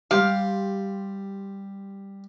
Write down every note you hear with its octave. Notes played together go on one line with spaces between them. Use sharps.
G3 G4 F5 C6